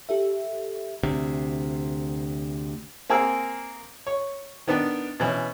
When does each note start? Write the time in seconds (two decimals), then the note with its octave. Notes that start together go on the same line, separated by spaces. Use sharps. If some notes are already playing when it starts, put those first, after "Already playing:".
0.09 G4 A4 E5
1.03 D2 C3
3.10 A#3 C4 G#4 A#4 E6
4.07 C#5
4.68 D#3 B3 D4
5.20 B2 E3 C#4